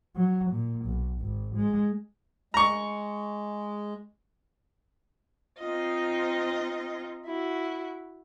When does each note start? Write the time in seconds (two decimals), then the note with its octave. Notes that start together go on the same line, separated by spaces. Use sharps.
0.16 F#3
0.51 A#2
0.86 B1
1.20 G#1
1.56 G#3
2.54 G#3 A#5 C#6
5.60 C4 D#4 F4 D#5
7.26 E4 F#4